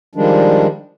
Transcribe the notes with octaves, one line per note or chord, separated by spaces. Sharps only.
D#3 F3 G3 G#3 D4